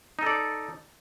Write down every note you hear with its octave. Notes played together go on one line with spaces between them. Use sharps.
D#4 A4 D5